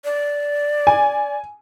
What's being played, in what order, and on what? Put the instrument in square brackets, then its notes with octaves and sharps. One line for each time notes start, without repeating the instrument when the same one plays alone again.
[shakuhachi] D5
[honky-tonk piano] G#5